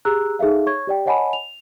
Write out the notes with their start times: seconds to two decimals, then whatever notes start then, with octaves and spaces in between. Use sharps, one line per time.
0.05 G4 G#4 A#5 E6 F#6
0.39 D#4 G#4 A4 E5 F5
0.66 C#5 C#6 G#6
0.87 G4 D5 G5
1.06 C#5 D#5 F#5 G#5 A5 B5
1.33 F7